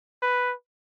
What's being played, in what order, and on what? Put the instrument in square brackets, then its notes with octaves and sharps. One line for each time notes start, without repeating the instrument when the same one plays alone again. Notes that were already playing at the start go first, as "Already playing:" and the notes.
[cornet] B4